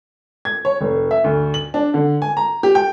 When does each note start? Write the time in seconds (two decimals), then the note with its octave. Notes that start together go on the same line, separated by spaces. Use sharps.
0.45 G#6
0.65 C#5
0.81 F1
1.11 E5
1.24 D2
1.54 F#7
1.74 D4
1.94 D3
2.22 G#5
2.37 A#5
2.63 G4
2.75 G5